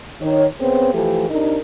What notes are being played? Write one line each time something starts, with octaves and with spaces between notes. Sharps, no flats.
D#3 C#5
C#3 B3 C4
E3 F3 A3 G4
C3 D4 D#4 A#4